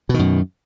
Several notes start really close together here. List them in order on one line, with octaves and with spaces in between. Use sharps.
B2 D#3 F#2